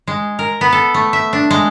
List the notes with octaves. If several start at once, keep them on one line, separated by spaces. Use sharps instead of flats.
G#3
A#4
B3
A4
A3
E5
D4
G#3